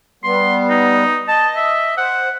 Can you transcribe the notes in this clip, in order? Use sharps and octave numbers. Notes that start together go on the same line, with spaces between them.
G3 B3 C6
D#4
D#5 A5
E5
C5 F#5